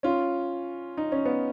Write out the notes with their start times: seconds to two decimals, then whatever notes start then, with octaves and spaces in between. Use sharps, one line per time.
0.03 C#4 F4
0.97 D#4
1.12 C#4
1.25 B3